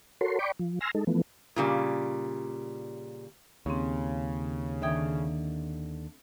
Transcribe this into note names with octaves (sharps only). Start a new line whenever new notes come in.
F#4 A4 A#4 C#5 C6
D5 G5 B5 C#6 D6
F3
G#5 C6 E6 F6 A#6
G#3 D#4 A4
E3 F3 A3 B3
A#2 C#3 G3
D#2 C#3 C4 C#4
D3 D#3 E5 G5 D#6 G#6